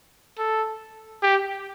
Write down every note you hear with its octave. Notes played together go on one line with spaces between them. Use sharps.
A4
G4